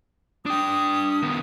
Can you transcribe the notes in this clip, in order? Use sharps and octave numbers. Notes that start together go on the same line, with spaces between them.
D4 G5 D#6
D#3 B3